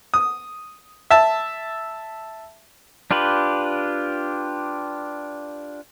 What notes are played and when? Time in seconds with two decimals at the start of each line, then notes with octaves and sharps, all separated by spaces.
0.14 D#6
1.11 E5 A5
3.11 D4 F4 G4 B4